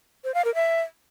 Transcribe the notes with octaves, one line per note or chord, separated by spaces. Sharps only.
C5
F5
A#4
E5